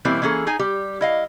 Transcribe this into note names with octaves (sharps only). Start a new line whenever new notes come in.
B2 E3 G3 A#3 C4 E4
E3 A#3 C#4 G#4 A4
D#4 G#4 G#5
G3 G4
E4 D#5 F5